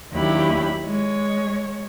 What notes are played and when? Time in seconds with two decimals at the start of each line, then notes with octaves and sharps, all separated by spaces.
0.12 D#2 F#3 D4 E4 G4 B5
0.86 G#3 C#5